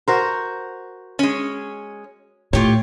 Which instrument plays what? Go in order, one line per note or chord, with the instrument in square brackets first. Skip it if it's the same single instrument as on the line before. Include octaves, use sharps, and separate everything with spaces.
[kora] F#4 A#4 C5
[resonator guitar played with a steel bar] G#3 C#4
[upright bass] A2 [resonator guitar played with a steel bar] F4 G4 C#5